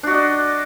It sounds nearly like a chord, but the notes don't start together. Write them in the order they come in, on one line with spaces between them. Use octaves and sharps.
D4 F#4 D#5 D5